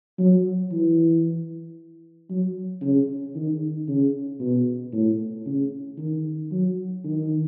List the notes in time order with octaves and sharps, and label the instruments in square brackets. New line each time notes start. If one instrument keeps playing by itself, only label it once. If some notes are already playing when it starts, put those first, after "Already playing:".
[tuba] F#3
E3
F#3
C#3
D#3
C#3
B2
A2
C#3
D#3
F#3
D#3